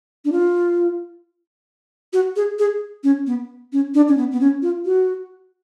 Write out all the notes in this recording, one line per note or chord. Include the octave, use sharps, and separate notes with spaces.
D4
F4
F#4
G#4
G#4
C#4
B3
C#4
D4
C#4
B3
B3
C#4
F4
F#4